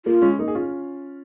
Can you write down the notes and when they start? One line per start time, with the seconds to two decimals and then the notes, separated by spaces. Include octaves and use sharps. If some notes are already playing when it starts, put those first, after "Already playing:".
0.05 A#3 F4
0.22 G#3 C#4
0.39 A#3 D#4
0.48 G#4
0.55 C#4 F4